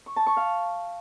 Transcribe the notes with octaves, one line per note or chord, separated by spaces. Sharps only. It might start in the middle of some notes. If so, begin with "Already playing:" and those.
C#6
A5
C#6
F5